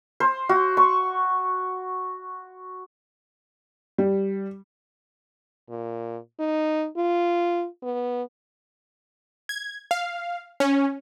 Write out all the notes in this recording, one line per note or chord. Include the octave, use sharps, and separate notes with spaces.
C5
F#4
C#6
G3
A#2
D#4
F4
B3
G#6
F5
C#4